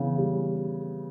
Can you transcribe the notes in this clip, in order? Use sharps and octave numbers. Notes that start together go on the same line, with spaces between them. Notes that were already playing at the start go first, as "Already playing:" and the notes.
Already playing: C#3 E3 B3
G3